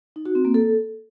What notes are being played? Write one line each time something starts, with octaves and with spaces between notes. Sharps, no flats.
D#4
F#4
C4
A#3
A4